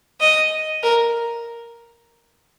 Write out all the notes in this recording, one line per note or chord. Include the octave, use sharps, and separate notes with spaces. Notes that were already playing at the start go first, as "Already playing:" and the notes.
D#5
A#4